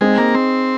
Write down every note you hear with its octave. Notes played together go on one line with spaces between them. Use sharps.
G#3 C4 D#4 G#4
A#3
C4